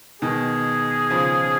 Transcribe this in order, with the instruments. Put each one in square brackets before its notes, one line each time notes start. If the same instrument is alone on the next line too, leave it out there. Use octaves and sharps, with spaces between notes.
[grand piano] B2 D#3 [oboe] G#4
[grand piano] C#3 F3